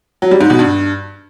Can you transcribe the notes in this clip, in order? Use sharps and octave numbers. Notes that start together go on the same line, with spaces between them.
F#3
G3
G#2
B2
G2